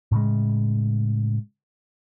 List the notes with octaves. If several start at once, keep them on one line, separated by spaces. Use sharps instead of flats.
A2 C#3 G#3